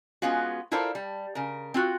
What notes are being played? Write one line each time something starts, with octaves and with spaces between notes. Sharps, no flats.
G#3 B3 C#4 F4 F#4
E4 F4 A4 A#4 C5 D5
G3
C#3 A#4
C4 F4 F#4